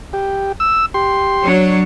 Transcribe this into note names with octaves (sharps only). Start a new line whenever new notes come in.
G4
E6
G4 C6
F#3 D4 C#5